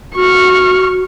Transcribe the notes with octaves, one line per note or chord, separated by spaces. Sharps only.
F#4 C#6 F6